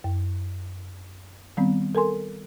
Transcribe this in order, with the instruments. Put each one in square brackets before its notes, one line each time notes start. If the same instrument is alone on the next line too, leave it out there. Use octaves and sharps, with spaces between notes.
[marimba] F#2
D#3 G3 B3 C4
A4 A#4 G#5 C6